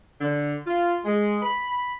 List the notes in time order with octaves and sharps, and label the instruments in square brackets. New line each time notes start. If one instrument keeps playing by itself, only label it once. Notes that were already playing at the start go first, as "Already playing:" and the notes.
[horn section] D3
F4
G#3
B5